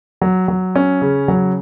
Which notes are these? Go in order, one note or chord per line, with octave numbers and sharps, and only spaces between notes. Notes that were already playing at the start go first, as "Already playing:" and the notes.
F#3
F#3
C#4
C#3
F#3